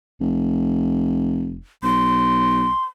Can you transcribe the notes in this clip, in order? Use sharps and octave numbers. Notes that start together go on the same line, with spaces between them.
F1
B1 C6